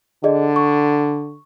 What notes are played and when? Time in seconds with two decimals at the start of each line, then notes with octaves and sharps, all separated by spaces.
0.24 D3 G#4 D5 D#5
0.56 C#6